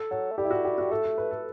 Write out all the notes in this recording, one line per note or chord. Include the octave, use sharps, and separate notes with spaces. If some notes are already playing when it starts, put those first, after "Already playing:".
Already playing: A4
F#3 A4
A3
G3 G4
E4
F#4
G4
F#4
A3 A4
A4
B4
A4